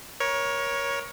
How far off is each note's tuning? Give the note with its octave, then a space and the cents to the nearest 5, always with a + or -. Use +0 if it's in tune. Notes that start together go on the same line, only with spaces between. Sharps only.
A#4 +30 C#5 +0